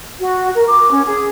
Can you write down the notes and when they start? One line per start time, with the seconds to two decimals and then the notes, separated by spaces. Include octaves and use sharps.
0.18 F#4
0.54 A#4
0.67 D6
0.91 C#4
1.05 G#4